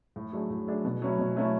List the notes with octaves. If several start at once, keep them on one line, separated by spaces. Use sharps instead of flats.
A2
F#3 A3 D4 G#4
A2
F#3 A3 D4 G#4
B2
F#3 A3 C#4 E4
B2
F#3 A3 C#4 E4